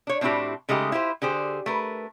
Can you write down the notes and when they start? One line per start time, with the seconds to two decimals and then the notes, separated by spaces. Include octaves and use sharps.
0.07 D4 C#5
0.21 A2 C4 D4 E4 F#4 G4
0.69 C#3 G#3 A3 D#4 G4
0.92 E4 F4 G4 C5
1.22 D3 G4 G#4 C5
1.66 A3 A#4 B4